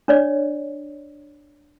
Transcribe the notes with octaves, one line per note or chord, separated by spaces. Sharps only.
D4 C#5 D5